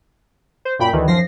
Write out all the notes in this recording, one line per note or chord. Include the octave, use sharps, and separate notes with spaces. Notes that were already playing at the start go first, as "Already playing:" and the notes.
C5
F#2 A#2 G5 B5
D2 D#3 E3
F#2 F3 A#6 C7